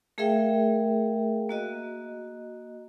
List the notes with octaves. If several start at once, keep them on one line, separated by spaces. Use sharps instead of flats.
A3 G#4 A#4 E5 F5 G5
A#3 F#4 D#5